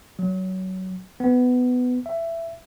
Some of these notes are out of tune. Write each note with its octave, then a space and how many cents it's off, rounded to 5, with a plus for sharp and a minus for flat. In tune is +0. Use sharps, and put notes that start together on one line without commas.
F#3 +20
B3 +15
E5 +15